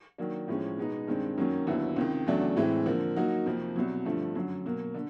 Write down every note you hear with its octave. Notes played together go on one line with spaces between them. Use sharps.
D#3 F#3 A#3 D4
A2 F3 G#3 C#4
B2 G#3 B3 D#4
G2 D#3 G#3 C4
F#2 D#3 F#3 A#3 C#4
D#2 D3 F#3 B3 E4
C#2 C3 D#3
E2 C#3 F#3 A3 D4
A2 E3 G#3 C4
D3 F3 A#3
F#3 A#3 D#4 F#4
F2 C3 F3 A#3
C2 B2 F#3
G2 D3 F3 A3
F#2 D3 F#3
B2 F#3 A#3
D3